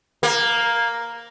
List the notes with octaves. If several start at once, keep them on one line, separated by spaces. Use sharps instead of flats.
A#3